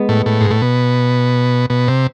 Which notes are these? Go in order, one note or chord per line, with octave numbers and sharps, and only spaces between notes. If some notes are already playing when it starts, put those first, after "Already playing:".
Already playing: G#3 B3
A2
A2
G#2
A2
B2
B2
C3